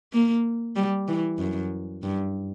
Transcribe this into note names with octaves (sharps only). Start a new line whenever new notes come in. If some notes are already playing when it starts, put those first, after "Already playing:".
A#3
G3
E3
F#2
G2